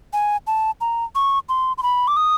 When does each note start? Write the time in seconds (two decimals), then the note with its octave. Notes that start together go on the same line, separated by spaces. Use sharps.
0.13 G#5
0.47 A5
0.81 A#5
1.15 C#6
1.49 C6
1.78 C6
1.83 B5
2.08 D6
2.17 D#6